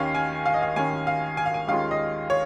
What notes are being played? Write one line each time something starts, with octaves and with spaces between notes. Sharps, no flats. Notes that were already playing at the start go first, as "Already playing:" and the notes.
Already playing: D#2 D#3 C#4 F5
G#5
F5
D#5
F5
D#2 D#3 C#4 G#5
F5
G#5
F5
G#5
D#2 D#3 G#3 C#4 F4 F5
D#5
C#5